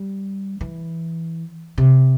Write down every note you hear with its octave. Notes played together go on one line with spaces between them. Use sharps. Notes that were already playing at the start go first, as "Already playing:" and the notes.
Already playing: G3
E3
C3